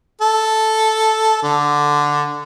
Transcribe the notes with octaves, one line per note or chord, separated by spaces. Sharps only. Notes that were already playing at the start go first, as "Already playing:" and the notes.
A4
D3